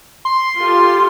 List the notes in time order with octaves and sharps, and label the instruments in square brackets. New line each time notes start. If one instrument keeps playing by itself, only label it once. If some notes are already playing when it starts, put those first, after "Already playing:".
[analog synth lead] C6
[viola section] F4 G4 A4